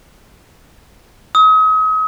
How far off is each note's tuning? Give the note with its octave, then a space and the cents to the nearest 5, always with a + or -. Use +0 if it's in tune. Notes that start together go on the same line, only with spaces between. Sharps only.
D#6 +40